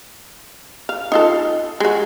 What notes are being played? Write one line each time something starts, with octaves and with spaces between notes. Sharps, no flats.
F5
D#4 F4 A4
G#3 F#4